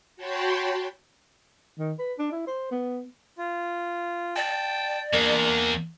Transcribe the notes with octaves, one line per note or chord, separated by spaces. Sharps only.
F#4 C#5 G5 A5 B5 C6
D#3
B4
D4
E4
C5
B3
F4
D5 G5 A5
E2 A#3 D4